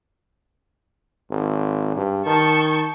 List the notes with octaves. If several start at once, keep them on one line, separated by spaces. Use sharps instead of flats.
G#1
G2
D#3 A5 C#6 G6